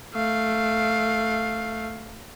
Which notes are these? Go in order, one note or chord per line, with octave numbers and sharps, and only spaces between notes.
A3 F5